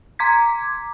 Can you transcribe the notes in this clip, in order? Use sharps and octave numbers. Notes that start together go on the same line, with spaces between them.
A#5 C6 D6 G#6 B6